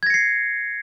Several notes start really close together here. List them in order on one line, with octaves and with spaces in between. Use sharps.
G#6 A#6 C#7 C7